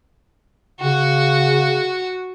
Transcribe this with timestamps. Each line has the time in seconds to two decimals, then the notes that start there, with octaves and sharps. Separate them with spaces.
0.81 C#3 F#4